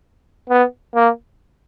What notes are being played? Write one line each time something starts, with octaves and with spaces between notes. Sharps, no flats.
B3
A#3